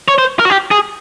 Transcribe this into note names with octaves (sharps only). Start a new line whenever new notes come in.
C#5
C5
A#4
F#4
G4
G#4